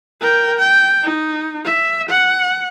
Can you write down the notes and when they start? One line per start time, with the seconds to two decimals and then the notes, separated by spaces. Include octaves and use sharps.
0.21 A#4 G5
0.58 G5
1.03 D#4
1.65 E5
2.09 F#5